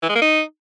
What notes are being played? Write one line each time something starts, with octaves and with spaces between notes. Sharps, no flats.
E3
G#3
A#3
D#4